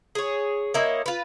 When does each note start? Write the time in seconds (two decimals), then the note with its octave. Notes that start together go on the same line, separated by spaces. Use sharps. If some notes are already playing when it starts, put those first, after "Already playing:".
0.15 G#4 C#5
0.74 A#3 E4 C#5 D#5
1.06 F4 B4